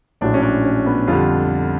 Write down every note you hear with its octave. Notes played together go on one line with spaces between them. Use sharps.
A#1 A2 F#3 D4
C#4
D4
C#4
B3
F2 D3 G3 F4